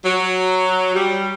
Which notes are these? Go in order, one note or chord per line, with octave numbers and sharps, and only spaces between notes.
F#3
G3